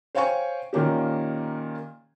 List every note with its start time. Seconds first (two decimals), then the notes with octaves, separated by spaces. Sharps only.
0.15 C5 C#5 F5 G5 G#5 C#6
0.73 A#2 D#3 A#3 C#4 G4